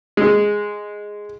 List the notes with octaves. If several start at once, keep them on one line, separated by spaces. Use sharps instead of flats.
G#3